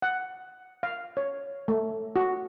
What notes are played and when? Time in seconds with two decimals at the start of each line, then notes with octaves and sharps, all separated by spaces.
0.02 F#5
0.83 F5
1.17 C#5
1.68 A3
2.16 F#4